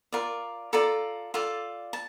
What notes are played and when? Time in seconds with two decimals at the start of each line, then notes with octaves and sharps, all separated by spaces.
0.13 F4 A#4 D5
0.73 F4 A4 D5 A#5
1.34 F4 A4 D5
1.93 A5